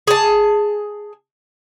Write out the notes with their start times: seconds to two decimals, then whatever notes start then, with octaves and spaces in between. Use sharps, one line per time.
0.08 G#4 A5